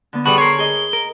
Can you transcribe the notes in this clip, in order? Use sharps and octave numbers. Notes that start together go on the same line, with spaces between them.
D3 B3
G3 B3 F#4 G#4 A4 B5 F#7
A#4 C#5 C6
G#4 D#5 G7
A#4